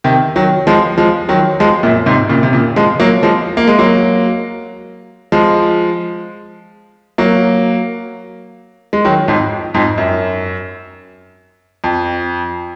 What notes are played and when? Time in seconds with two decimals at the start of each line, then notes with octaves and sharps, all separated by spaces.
0.04 C3 D#3
0.36 D#3 F#3
0.67 F3 G#3
0.98 F3 G#3
1.29 D#3 F#3
1.60 F3 G#3
1.83 F#2 A#2
2.06 G#2 C3
2.29 A#2 C#3
2.43 C3
2.53 A#2 C#3
2.76 F3 G#3
3.00 F#3 A#3
3.23 F3 G#3
3.57 A#3
3.68 G#3
3.79 F#3 A#3
5.32 F3 G#3
7.18 F#3 A#3
8.93 G#3
9.05 D#3 F#3
9.28 F2 G#2
9.74 F2 G#2
9.98 F#2
11.84 F2